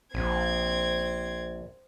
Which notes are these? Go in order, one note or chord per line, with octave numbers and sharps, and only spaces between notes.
A#1 C4 G#6